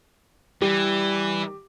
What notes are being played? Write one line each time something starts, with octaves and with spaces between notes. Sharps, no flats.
E3 G3 G4